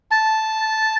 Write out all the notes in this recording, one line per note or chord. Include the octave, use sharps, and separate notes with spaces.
A5